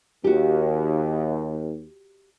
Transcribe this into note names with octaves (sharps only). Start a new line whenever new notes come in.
D#2 F#4 G4